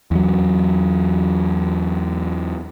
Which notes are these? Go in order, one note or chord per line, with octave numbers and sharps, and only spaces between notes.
E2 F#3